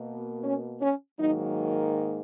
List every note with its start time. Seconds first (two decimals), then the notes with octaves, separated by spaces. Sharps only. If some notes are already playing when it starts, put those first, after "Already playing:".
Already playing: B2 A#3
0.44 C#4
0.81 C#4
1.19 G#2 D#3 F#3 A#3 D#4